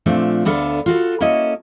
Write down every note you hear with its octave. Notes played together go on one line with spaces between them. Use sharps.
A#2 F3 A3 C4 D4
D2 B3 D4 A4 F5
F4 F#4 A4
A#3 C#4 E4 A4 D#5